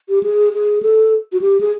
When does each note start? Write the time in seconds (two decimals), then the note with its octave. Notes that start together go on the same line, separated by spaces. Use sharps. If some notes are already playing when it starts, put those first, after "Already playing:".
0.09 G4
0.23 G#4
0.53 G#4
0.83 A4
1.33 F#4
1.41 G4
1.61 G#4